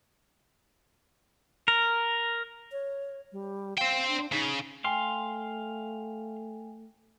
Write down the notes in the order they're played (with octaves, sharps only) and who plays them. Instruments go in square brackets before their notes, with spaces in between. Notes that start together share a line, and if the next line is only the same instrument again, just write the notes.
[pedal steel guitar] A#4
[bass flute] C#5
G3
[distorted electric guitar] C5 G5 [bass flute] F5
[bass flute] D4
[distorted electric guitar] C#3 [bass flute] D#4
[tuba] A3 [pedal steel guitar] F5 C6 [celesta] G5 G#5